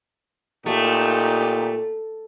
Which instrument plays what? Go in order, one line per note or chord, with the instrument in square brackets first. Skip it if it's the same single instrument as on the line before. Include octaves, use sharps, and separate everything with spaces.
[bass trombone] A#2 [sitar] A3 [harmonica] D#4 G4